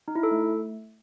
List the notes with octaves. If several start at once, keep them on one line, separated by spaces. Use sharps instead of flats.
D#4
E4
A4
A3